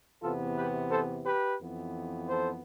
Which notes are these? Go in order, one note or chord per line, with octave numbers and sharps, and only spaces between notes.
E2 C3 E3 B3 F4 A4
G4 B4
A4 C5
G4 B4
F2 E3 B3
A4 C5